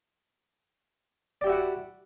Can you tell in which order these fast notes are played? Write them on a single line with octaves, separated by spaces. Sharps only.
D5 G4 E4 F#4 F#5